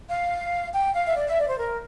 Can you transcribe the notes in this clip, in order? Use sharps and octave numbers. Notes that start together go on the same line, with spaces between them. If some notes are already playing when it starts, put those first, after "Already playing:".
F5
G5
F5
E5
D5
E5
D5
C5
A#4